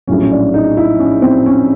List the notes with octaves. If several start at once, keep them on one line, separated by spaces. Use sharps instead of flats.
A#1 A2 F#3 C#4
C#4
D4
D#4
E4
C#4
C4
C#4